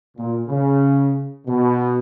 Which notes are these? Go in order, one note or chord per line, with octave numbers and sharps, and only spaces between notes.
A#2
C#3
B2